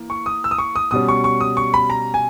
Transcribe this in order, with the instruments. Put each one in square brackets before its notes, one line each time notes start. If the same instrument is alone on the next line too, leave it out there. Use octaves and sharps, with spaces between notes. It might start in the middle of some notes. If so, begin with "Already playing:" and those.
Already playing: [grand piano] E3 A#3
C#6
D#6
E6
D#6
C#6
D#6
B2 G3 C#4 D#6
C#6
C#6
D#6
C#6
B5
A#5
G#5